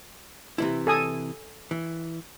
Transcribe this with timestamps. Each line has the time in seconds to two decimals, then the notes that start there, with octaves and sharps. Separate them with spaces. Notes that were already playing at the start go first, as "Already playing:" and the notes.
0.58 C3 E3 E4
0.87 A4 G#5 D#6
1.71 E3